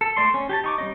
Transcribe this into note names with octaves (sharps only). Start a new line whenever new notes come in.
A4
A3 D5 C6
C#4
G4 G#5 A5
D#4 C#6 D6
G3 C#4 D#5